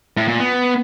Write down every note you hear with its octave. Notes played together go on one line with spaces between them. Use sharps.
A2
A#2
B3